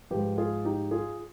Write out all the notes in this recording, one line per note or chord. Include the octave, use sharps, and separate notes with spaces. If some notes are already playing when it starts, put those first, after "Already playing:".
G#2 F3 G4 B4
F4 G#4
D#4 G4
F4 G#4